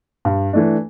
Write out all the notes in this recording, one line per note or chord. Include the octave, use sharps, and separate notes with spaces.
G2
E3 A3 D4